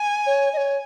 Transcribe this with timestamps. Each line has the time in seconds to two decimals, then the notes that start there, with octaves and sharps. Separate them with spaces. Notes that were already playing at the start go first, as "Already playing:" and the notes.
Already playing: G#5
0.26 C#5
0.53 D#5
0.57 C#5